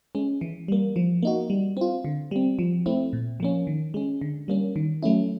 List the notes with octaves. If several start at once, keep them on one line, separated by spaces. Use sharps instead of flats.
G#3 C#4
E3
G3 A#3
F3
A#3 D#4 F#4
G3
C4 F4
D3
G3 C4
F3
A3 C4 E4
A#2
F3 A#3 C#4
D#3
G#3 C#4
D3
G3 A#3 C#4
D#3
F#3 A3 C#4 E4